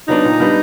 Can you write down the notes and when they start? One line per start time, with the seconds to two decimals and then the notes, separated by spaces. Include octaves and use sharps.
0.08 F#3 B3 D4 D#4
0.25 A#2
0.40 G3 B3 D4